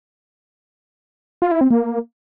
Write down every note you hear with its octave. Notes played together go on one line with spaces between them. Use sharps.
F4
E4
C4
A#3